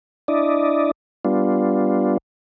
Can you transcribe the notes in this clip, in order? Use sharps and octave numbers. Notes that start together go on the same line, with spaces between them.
D4 E4 D5 D#5
G3 B3 D4 F4